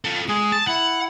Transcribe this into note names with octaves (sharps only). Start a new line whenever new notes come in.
F4 A4
G#3 G#4
A5
E4 F#5